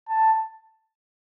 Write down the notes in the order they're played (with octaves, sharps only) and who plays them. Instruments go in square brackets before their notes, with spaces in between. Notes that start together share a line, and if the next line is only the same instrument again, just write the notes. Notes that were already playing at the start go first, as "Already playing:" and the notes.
[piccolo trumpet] A5